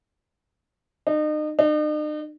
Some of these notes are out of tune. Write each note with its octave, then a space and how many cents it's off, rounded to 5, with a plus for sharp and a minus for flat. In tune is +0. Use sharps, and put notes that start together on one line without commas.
D#4 -35
D#4 -45